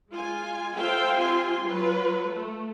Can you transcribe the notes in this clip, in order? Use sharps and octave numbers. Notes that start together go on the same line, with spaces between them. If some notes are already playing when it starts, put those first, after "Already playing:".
G#3 F4 G#5
F4 A4 C5 E5 F5 G5
C4 F4 G4 G#5 C6
F#3 F4 B4
A3